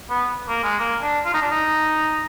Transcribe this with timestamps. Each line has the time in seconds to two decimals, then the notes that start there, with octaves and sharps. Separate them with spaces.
0.10 B3
0.48 A#3
0.64 G#3
0.79 A#3
1.02 D4
1.25 F4
1.34 D#4
1.42 D4
1.51 D#4